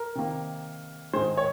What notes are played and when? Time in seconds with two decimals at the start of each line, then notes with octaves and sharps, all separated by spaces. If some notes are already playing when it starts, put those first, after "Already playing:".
Already playing: A#4
0.15 C3 D#3 A#3
1.13 G#2 D#3 G#3 C5
1.37 C#5